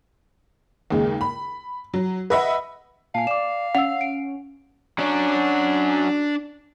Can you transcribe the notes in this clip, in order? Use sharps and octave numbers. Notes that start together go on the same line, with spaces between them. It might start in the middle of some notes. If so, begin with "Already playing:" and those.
D#2 C#3 G#3
B5
F#3
B4 D#5 E5 F#5 B5
A#2 F5 G#5 A5
D5 D6 E7
C#4 F#5 E6 F7
D7
F#3 C#4 D4 F#4